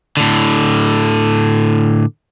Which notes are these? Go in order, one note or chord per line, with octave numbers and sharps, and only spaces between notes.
A2 D3